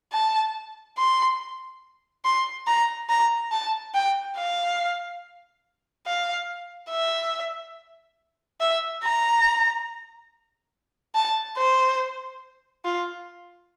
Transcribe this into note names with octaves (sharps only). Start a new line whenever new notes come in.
A5
C6
C6
A#5
A#5
A5
G5
F5
F5
E5
E5
A#5
A5
C5
F4